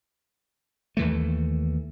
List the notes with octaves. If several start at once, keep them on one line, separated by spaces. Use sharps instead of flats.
D#2 E3 A3